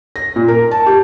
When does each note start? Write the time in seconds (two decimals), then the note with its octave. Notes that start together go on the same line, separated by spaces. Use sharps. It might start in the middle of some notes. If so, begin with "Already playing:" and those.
0.16 A#6
0.36 A#2
0.48 A#4
0.71 A5
0.86 G4